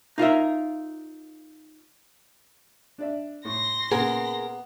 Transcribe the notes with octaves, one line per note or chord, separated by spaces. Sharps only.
D#4 F4 A#4 E5
D4 D5 E5
A2 C6 A#6
A#2 C#3 B3 G#4 A#4